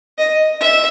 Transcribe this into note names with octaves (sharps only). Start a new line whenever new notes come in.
D#5
E5